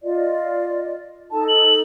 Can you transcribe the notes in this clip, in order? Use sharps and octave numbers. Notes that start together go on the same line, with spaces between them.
F4 D5 D#5
D#4 A4 A5
F#7